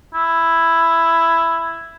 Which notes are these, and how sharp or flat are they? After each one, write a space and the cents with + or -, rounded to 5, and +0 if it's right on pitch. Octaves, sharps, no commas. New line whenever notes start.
E4 +5